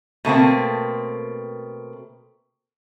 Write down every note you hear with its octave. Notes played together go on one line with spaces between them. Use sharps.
B2 A3 A#3 C4